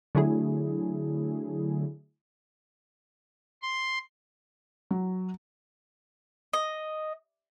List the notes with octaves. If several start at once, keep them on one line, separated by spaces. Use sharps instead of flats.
D3 F#3 A3 E4 G#4
C6
F#3
D#5